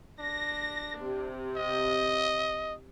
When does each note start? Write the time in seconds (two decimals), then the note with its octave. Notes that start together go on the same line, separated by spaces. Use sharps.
0.19 D4 A#6
0.99 C3
1.57 D#5